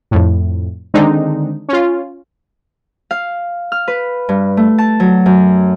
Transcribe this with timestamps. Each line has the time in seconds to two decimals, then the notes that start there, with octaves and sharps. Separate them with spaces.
0.11 F2 A2
0.94 D3 D#3 G#3 C4 D4 D#4
1.69 C#4 F4
3.11 F5
3.72 F6
3.88 B4
4.29 G2
4.57 A3
4.78 A5
5.00 F#3
5.26 F#2